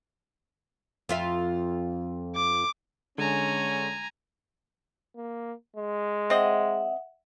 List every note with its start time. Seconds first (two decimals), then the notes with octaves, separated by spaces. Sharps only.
1.09 F2 F4 E5
2.35 D6
3.18 D3 G#3 C#4 G#5 A#5
5.16 A#3
5.76 G#3
6.30 C4 D#5 E5 F#5